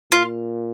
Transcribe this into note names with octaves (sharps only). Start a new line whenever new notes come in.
A#2 F4